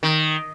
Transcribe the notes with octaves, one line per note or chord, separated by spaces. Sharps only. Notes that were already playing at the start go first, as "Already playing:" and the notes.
D#3